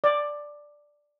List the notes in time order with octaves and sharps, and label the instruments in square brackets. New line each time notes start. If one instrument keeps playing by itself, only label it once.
[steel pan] D5